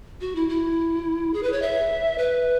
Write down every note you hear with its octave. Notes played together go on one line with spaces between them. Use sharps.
F#4
E4
E4
G#4
B4
C#5
E5
B4